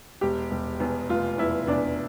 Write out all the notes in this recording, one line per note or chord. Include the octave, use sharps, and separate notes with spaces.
E1 G4
E1
E2
F1 F4
E2 E4
E2 D4